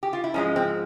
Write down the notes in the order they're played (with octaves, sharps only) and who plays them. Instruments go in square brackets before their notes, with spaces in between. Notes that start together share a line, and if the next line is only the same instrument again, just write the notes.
[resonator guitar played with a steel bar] G4
F4
E4
G#2 F3 G#3 C#4
C4